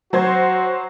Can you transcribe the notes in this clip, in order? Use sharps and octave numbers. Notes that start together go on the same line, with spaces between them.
F#3 F#4 C5 G#6